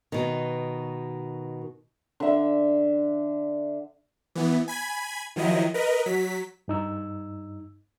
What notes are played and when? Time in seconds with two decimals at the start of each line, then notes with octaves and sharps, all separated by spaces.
0.12 B2 D#3
2.20 D3 E5
4.35 E3 B3
4.68 G#5 B5 G#6
5.36 D#3 F3 F#3 E4 D#5
5.74 A#4 B4 D#5
6.06 F#3 B6
6.68 G2 D#4 E6